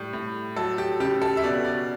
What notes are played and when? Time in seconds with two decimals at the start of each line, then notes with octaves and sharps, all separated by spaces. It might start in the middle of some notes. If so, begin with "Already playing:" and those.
Already playing: A2 G3
0.13 A2
0.56 F#3 A4
0.78 G4
1.00 C#3 G4
1.22 A4
1.37 E5
1.44 B2 D5
1.65 D5